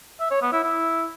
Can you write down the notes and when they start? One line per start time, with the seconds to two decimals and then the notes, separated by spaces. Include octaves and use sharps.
0.20 E5
0.31 C#5
0.42 B3
0.52 E4
0.63 E4